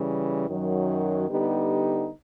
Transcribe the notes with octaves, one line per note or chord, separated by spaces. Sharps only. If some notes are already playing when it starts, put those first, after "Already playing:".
Already playing: C#3 E3 G3
F#2 D#3 F#3
D3 G3 B3 D#4 G4